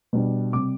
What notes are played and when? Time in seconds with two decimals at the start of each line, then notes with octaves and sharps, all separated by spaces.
0.13 B2 G3 D4
0.53 C3 G3 C4 D6